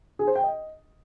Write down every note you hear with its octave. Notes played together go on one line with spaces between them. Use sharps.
G#4
C5
G5
D#5